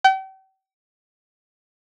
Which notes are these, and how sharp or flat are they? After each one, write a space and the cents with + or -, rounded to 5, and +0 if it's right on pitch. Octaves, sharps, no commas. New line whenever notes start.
G5 -40